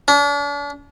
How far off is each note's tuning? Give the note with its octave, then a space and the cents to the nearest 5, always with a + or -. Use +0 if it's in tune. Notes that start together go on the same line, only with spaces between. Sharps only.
D4 -40